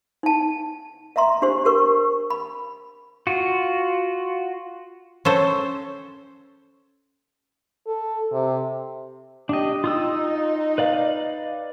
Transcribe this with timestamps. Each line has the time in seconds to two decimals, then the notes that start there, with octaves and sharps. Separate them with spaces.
0.23 D#4 A5
1.16 D#5 E5 A#5 C6
1.42 D4 G4 C5 C6
1.65 G4 A#4 C#6
2.30 B5
3.27 F4 F#4
5.25 C#4 A4 C5
7.87 A4
8.32 C3
9.49 D4 G4 D#5
9.84 D#4 F4 D#6 E6
10.78 B4 D5 F5